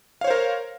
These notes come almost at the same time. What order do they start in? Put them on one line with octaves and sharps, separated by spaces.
F5 C#5 C5 A#4